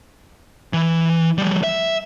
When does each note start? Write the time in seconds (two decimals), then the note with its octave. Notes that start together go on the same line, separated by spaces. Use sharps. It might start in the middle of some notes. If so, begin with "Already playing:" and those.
0.73 E3
1.38 F3 G3
1.64 E5